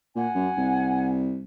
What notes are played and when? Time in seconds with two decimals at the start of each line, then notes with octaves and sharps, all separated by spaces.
0.16 A#2 F#5 G#5
0.35 F#2
0.57 C2